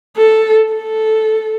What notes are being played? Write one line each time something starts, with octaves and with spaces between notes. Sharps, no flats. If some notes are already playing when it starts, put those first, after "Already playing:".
A4
A4